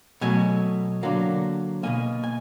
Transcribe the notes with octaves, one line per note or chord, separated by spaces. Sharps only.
B2 F#3 A3 G#5
D3 F#3 A#3
B2 F#3 A#3 G#5
G#5